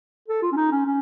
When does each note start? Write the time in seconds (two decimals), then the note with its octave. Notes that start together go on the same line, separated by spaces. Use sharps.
0.28 A4
0.42 F4
0.52 C#4
0.57 D#4
0.71 C#4
0.86 C#4